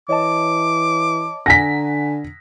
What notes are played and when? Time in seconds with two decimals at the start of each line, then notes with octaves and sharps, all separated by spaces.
0.09 E3 C#5 D#5 A5 D6
1.46 D3 F#5 G#5 A#5 A#6 B6